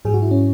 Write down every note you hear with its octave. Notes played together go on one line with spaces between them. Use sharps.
G#2 F#3 G#4
F#4
E4
C#4